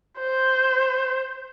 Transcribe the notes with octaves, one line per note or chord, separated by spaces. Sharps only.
C5